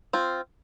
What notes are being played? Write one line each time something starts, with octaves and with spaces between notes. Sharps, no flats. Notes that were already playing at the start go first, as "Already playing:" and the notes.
C4 F4